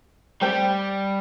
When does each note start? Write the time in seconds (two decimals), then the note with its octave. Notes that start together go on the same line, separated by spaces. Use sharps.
0.41 G3 A3 C4 G4 C5